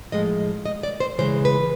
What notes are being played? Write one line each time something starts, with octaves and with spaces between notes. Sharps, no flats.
A2 F3 G#3 D#5
D#5
D5
C5
C#3 E3 G#3 C5
B4